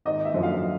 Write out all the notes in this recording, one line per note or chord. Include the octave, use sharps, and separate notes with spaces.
G#1 D#5
E5
F#2 D3 F3
F5